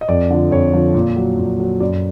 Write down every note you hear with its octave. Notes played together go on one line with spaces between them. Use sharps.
D#5
F2 D5
D3 F3
F2 C#5
D3 F3
A#2
F#3
A#2
F#3
F#2 D5